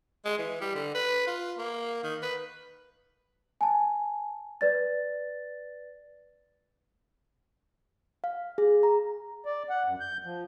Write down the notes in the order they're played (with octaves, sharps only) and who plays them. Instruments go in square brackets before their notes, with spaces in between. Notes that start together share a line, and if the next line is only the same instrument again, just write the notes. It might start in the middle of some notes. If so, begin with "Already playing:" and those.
[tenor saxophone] G#3
E3
G3
D3
B4
F4
A#3
D#3
B4
[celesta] G#5 A5
B4 D5 A6
[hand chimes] F5
G#4
A#5
[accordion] D5
F#5
F#2
G6
F3